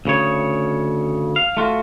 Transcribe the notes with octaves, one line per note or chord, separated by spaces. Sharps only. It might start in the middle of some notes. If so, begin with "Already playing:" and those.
D2 C#3 C#5
F5
A3 F4 F#4